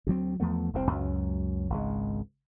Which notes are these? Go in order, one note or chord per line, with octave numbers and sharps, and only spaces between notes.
D2 F#3 C4
E2 F3 A3 B3
F1 C2 G#2 C4
C#2 F#2 F#3
G#1 C#2 G#3